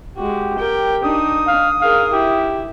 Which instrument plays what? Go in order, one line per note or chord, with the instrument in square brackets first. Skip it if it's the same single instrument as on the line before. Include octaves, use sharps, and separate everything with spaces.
[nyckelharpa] G#3 F#4 [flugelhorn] G4
[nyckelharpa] A#4 G5
[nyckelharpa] D4 D#4 [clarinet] D#6
[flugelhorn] F5
[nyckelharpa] G#4 A#4 [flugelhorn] F5
[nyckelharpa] E4 [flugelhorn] G4